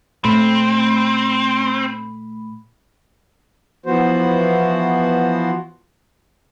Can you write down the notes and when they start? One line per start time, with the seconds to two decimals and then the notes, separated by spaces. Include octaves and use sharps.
0.24 A#2 A3 C4 B5
3.86 E3 F3 B3 F#4 C5